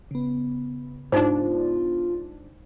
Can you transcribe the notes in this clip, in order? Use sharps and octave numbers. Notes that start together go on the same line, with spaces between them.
C#3 B3
G#2 D4 D#4 F4 C5